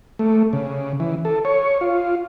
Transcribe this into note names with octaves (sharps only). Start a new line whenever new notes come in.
A3
C#3
E3
A4
C#5
F4